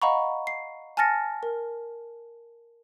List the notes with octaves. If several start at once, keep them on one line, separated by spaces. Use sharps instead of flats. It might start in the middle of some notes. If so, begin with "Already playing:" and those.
D#5 F5 F#5 A#5 B5 C#6
C7
G#5 A5 F6 A6 A#6 C#7
A#4